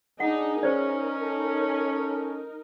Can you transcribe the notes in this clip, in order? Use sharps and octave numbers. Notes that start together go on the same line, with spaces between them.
D4 D#4 G#4 F#5
C#4 D#4 A#4 C5 D5
A4